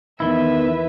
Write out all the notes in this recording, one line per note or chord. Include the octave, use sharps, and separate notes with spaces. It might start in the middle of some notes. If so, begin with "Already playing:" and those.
E2 D#3 E4 B4 E5